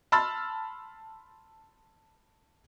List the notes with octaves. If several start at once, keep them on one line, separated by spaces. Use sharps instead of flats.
A5 B5 C6 E6 F6 A6